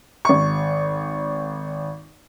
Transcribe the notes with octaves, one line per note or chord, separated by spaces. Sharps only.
G#1 C#6